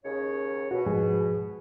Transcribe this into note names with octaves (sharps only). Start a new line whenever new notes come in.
D#2 C#3 C#5
B2 F#4
G#2 F3 G#4